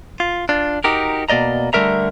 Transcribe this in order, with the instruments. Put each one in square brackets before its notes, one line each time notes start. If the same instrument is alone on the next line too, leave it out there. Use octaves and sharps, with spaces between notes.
[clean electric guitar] F4
D4 F4
D#4 F#4 G4 A#4
B2 A#3 D5 D#5 A#5
D3 G3 A3 A#4 E5 A#5